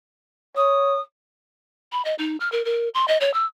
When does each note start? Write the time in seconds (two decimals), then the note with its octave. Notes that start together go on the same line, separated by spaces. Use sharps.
0.56 C#5 D#6
1.92 B5
2.05 D#5
2.19 D#4
2.40 F6
2.52 A#4
2.65 A#4
2.94 C6
3.08 D#5
3.21 C#5
3.34 E6